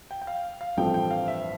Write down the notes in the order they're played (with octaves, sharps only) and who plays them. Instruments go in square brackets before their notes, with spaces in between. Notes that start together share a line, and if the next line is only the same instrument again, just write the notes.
[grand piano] G5
G5
F5
F5
[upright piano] A1 G2 F3 A3 C4 [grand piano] G5
[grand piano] G5
F5
E5